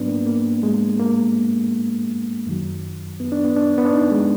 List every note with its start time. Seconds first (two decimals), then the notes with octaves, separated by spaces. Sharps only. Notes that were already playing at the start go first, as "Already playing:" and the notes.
Already playing: G#2 F#3 B3 D4
0.08 A#3
0.26 A#3
0.63 G#3
1.00 A#3
2.47 F#2 D#3 F#3
3.20 B3
3.32 D4
3.44 B3
3.56 D4
3.78 B3
3.85 D4
3.93 D#4
4.11 G#3